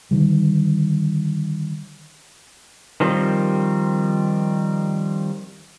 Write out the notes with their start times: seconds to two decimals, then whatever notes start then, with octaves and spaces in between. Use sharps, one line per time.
0.11 D3 D#3 G3
3.00 D#3 F3 G3 C4